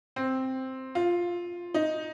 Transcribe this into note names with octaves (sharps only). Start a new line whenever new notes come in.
C4
F4
D#4